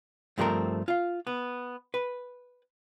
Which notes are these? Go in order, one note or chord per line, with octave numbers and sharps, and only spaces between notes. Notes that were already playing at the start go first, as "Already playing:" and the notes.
G2 F3 A3 C4 F4 A#4
F4 F5
B3
B4